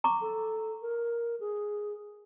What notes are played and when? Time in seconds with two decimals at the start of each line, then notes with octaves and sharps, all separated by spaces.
0.04 A#5 C#6 D6
0.21 A4
0.82 A#4
1.40 G#4